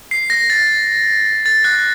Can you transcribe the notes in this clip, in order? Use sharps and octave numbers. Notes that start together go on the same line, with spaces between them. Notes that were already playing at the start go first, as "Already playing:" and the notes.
C7
A#6
A6
A6
F#6